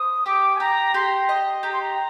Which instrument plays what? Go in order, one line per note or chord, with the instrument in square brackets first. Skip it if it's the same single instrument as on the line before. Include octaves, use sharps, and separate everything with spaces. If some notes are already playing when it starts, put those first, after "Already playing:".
Already playing: [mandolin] C5 [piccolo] D#6
[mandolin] G4 [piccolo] D6
[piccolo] G#5
[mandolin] G4 [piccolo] A#5
[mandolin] G4 [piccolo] C6
[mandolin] D#5
[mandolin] G4 [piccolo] A#5
[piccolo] C6
A#5